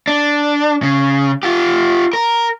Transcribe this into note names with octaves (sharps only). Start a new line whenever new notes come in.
D4
C#3
F4 G4
A#4